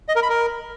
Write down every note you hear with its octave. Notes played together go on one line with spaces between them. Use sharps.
D#5
A#4
B5
A#4